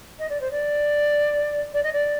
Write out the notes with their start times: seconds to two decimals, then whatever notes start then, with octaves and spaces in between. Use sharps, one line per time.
0.19 D#5
0.29 D5
0.40 C5
0.51 D5
1.73 D5
1.83 D#5
1.93 D5